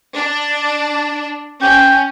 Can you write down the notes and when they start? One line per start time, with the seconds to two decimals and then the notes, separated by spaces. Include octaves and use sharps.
0.16 D4
1.62 C#4 G5